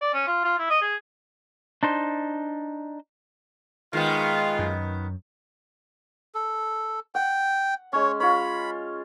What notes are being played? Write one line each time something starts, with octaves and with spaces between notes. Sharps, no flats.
D5
C#4
F4
F4
E4
D#5
G#4
D4 D#4 C5
D#3 G#3 B3 F4
F#2
A4
F#5 G5
G#3 C#4 C#5
F4 C#5 B5